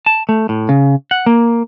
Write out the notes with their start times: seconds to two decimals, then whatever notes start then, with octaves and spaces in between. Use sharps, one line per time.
0.06 A5
0.29 A3
0.49 A2
0.69 C#3
1.11 F#5
1.26 A#3